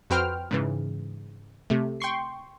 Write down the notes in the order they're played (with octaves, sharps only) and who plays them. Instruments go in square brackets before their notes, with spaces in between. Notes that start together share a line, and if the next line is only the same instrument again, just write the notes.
[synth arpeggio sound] F2 F#4 B4 C5 G5 F6
G#2 C#3 E3
C3 A3
G5 C6 C#6 C7